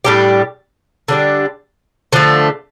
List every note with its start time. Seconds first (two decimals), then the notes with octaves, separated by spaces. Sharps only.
0.04 A2 G3 D4 G4
1.08 D3 G3 D4 G4
2.13 D3 F3 A3